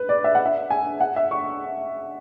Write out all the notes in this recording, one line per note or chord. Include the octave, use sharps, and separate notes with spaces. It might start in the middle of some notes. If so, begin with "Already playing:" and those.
Already playing: B4
D5
E5
F#5
E5
G#5
F#5
E5
C#6